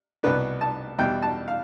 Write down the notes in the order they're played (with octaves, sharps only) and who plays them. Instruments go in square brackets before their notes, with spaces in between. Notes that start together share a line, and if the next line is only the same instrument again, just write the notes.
[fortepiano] C2 B2 B3 D4 B4
A5
E2 B2 G3 G5
A5
F5